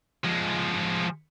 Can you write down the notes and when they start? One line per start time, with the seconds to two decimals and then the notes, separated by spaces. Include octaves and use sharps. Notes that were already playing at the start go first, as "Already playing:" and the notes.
0.24 F3 G#3